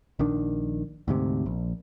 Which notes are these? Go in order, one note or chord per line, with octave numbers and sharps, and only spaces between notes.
A#1 D#3 D4
D2 G#2 C3
A#1